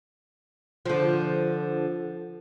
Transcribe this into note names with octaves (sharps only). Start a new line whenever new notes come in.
D3 F3